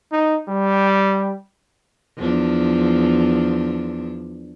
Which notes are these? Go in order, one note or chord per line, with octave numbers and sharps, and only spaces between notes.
D#4
G3
E2 F3 D4